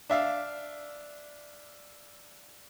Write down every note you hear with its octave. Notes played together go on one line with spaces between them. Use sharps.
D4 E5 F5